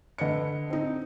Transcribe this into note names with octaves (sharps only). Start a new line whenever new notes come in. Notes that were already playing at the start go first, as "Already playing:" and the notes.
D3 B4 D#5 C#7
C4 D#4